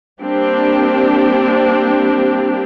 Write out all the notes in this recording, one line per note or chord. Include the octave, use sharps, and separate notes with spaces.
G3 A#3 C4 D4 G4